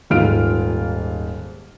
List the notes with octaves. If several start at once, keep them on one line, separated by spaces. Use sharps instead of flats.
D#1 G#2 F4 F6 D7